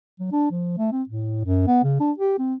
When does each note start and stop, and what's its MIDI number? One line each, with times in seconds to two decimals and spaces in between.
0.20 0.29 54
0.32 0.48 62
0.51 0.73 53
0.78 0.90 57
0.92 1.03 60
1.09 1.43 45
1.45 1.67 42
1.67 1.83 59
1.84 1.95 49
2.00 2.12 62
2.18 2.35 67
2.39 2.55 60